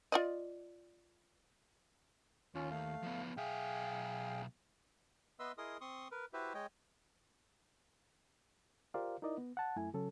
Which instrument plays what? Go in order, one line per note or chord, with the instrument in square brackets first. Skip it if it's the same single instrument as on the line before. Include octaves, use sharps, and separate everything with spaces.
[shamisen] F4 D5 D#5
[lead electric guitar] D#2 [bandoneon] C#4 F4
[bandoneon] A3 F5
[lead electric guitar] F3 B3
[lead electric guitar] B1 E5 [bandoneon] G#4 F5 G5
[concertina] B3 B4 D#5 E5 C6 E6
E4 G#4 A#4 D#5 C6 D#6
C4 C6 C#6 D#6
A#4 B4
E4 F#4 G4 B4 C5 E5
G#3 C#5 D#5 G5
[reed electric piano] F4 G4 A#4 C5 D5 F5
D#4 E4 A#4 D5 D#5
B3
F#5 A5
F#2 A3 E4 G#5
C#3 F#3 C#4 A4